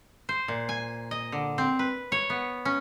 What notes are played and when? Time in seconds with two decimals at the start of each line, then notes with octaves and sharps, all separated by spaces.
0.29 C5
0.48 A#2
0.69 G#5
1.11 D#5
1.32 D3
1.58 C4
1.79 B4
2.12 C#5
2.30 B3
2.65 C#4